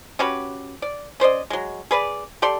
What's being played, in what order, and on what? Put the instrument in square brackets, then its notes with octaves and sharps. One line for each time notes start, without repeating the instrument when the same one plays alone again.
[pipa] C#4 F#4 G4 B4
D5
C#4 C5 D5 D#5
F#3 G#3
G#4 B4 D5
G4 A4 D5 C6